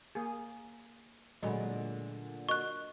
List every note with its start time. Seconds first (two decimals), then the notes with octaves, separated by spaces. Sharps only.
0.15 A#3 G#4
1.43 A#2 D3 F#3 G#3 A3 D#5 B5
2.49 F#4 A#4 D#5 C#6 F#6